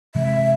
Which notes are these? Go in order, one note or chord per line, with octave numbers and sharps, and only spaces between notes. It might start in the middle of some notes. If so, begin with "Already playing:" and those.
C3 E3 G#3 E5